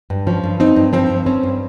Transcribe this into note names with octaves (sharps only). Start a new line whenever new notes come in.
G2
F3 C#4
G2
C4 D#4
G2
F3 C4
G2
C4 C#4
G2